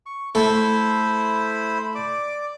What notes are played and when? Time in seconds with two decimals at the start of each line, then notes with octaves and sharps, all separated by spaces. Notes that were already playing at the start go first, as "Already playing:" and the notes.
0.06 C#6
0.35 A3 E4 A4 C5 B5
1.95 D5 D6